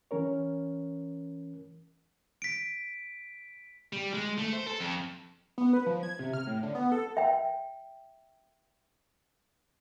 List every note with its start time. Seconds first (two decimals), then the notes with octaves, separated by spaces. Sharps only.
0.11 E3 C#4 A#4 C#5
2.42 B6 D7
3.93 G3
4.14 G#3
4.38 A3
4.53 C5
4.67 A4
4.80 F2
5.58 B3
5.73 B4
5.86 F3
6.03 G#6
6.19 C3
6.33 F6
6.47 A2
6.63 D3
6.75 B3
6.92 A4
7.17 E5 G5